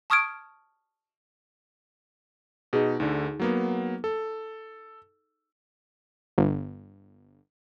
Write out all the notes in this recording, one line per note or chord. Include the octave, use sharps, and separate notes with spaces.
A5 C#6 D#6 F6 G#6 D7
B2 D#4 G#4
D2 D3 D#4
F#3 A#3 B3
A4
G1